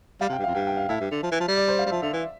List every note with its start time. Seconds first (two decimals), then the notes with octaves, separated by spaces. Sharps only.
0.21 G3 F5
0.29 C3
0.33 G5
0.38 G2
0.44 F2 F5
0.54 G2 G5
0.67 G5
0.77 F5
0.89 A2 E5
1.00 G2
1.11 D3
1.23 F3
1.31 E3
1.40 F3
1.48 G3
1.57 D5
1.68 C5
1.79 F5
1.86 G3
1.91 F3 E5
2.02 D3 E5
2.13 E3 E5